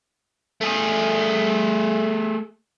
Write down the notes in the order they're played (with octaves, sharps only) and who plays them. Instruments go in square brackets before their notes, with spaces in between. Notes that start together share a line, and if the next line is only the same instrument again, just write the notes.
[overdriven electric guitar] A3 G#4